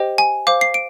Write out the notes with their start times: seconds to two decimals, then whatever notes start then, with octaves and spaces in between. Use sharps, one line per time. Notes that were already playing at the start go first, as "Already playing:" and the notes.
Already playing: G4 C5 D#5 G5
0.18 G#5
0.47 C5 F5 D6
0.61 C7
0.74 D7